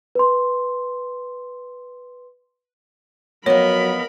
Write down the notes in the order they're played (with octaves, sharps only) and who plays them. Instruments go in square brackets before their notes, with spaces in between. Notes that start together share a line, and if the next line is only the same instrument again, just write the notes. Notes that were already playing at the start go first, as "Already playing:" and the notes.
[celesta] B4 C6
[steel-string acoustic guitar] F2 B3 [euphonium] F#3 [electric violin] A#4 B5 [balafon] C#5